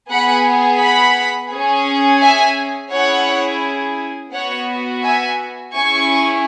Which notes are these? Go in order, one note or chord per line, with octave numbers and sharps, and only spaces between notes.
B3 G#4 F#5 B5
F#5 B5
C#4 G#4
E5 G#5
C#4 E4 G#4 C#5 F#5
B3 F#4 C#5 F#5
E5 G#5
C#4 E4 G#4 G#5 C#6